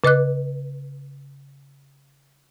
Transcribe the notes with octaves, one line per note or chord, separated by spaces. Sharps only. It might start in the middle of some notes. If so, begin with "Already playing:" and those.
C#3 B4 D#5 D6 F#6